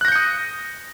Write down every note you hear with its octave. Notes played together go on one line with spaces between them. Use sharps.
D#6 F#6 G6 A#6 C#7